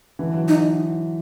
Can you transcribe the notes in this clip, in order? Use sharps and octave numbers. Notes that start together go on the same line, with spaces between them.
D3 E3
E3 F#3
D#4